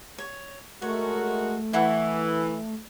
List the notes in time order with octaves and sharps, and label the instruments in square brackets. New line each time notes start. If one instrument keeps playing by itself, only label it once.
[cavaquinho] C#5
[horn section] G#3 F#4 A#4 [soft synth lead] A3 [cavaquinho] C#5
[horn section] E3 [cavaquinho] E4 F#5 C#6